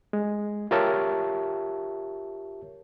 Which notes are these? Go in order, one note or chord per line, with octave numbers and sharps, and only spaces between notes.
G#3
F4 G4 A#4 C#5 E5 A5